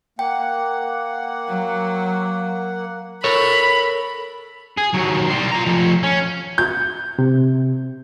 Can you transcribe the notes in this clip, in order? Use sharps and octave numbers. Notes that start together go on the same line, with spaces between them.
A#3 F#5 G5
F#3
A4 A#4 C#5 B5
G#4
D#2 F#3
G3 C5
F4 A#5
F3 A3
C#4
G6
C3